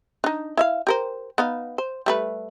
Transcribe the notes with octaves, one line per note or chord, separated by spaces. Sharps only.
D4 D#4
E4 E5 F5
G4 A#4 C5
B3 D#4 F5
C5
G3 A3 B4